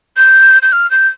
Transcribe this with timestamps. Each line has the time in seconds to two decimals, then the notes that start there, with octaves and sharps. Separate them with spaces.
0.17 G6
0.62 G6
0.73 F6
0.91 G6